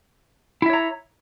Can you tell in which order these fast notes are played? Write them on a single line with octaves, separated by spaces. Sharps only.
E4 E5 C#5 A#5